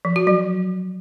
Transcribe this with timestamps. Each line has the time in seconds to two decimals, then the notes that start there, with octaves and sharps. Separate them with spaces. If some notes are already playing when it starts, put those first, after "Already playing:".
0.05 F3
0.16 F#4
0.27 F#3